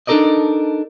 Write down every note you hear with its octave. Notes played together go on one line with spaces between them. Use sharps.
D4 D#4 A4 A#4 D5 D#5